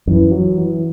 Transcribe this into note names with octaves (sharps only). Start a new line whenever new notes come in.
F#2 E3
F#3
E3